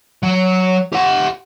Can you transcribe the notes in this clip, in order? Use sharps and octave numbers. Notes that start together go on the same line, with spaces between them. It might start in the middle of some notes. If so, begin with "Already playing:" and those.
F#3
G4 F#5